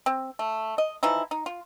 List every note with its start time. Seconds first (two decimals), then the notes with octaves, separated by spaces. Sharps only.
0.06 C4
0.39 A3
0.78 D#5
1.03 E3 F3 D#4 E4
1.31 D#4
1.46 F4